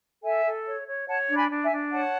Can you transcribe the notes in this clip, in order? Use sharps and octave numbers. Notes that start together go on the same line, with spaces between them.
A4 E5 G#5
A4
C#5
C#5
C#5 F#5 A5
D4
G#5 B5
D4
E5 G#5
D4
C#5 F#5 A5